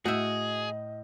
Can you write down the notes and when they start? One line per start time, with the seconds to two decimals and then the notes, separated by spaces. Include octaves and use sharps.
0.05 A2 F#4 G#4 D#5 E5 G6